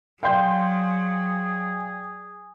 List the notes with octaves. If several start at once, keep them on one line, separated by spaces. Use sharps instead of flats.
F#3 G#4 D5 F5 G5 C6 G6